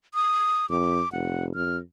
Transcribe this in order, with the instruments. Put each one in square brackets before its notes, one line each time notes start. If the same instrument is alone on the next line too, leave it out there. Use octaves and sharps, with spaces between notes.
[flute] D#6
[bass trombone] F2 [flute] D6
[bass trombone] F1 [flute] F#5
[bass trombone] F2 [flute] F6